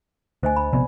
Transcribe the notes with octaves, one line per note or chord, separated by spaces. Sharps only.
D2 C5 D#5 G#5
B5
A#1 C3 B3 D5